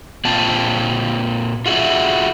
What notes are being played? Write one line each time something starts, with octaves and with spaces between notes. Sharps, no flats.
A#2 C4 F4 A5
F4 F#4 G#4 E5